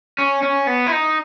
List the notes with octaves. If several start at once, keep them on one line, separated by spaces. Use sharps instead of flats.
C#4
C#4
B3
E4
D#4